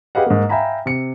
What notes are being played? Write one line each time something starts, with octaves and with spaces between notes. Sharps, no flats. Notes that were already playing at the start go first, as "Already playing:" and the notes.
G4 G#4 B4 D#5 F5 F#5
G#2 A#3
E5 F5 G5 G#5 A#5 B5
C3 C#7